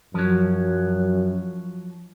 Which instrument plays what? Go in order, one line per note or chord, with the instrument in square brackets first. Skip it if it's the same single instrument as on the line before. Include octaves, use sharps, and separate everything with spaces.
[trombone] F#2 [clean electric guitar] F3 F#3